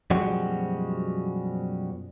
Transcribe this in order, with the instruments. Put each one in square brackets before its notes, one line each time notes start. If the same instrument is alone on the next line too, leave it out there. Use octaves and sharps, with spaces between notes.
[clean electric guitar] F#2 B2 F3 G3 G#3 F#4